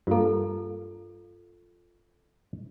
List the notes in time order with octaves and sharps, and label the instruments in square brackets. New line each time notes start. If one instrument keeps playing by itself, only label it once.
[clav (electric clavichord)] G2 A#3 [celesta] F4 A4